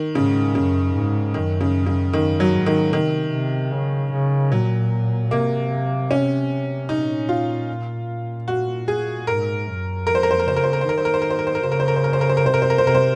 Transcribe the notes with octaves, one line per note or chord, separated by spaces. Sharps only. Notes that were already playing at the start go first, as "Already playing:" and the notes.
Already playing: D#3
G#2 C#3
F#2 C#3
G#2
F#2 D#3
C#3
C#3
F#2 D#3
F#3
G#2
D#3
C3 D#3
C3
C#3
C#3
A#2 F#3
C3 A#3
C#4
A#2 D#4
F4
F#4
G#4
G#2 A#4
F#2
F2 A#4
C5
A#4
C5
A#4
C#3 C5
A#4
C5
A#4
C5
D#3 A#4
C5
A#4
C5
A#4
C5
A#4
C5
A#4
C#3 C5
A#4
C5
A#4
C5
A#4
C5
A#4
C5
A#4
C3 C5
A#4
C5
A#4
C5
C3 A#4
C5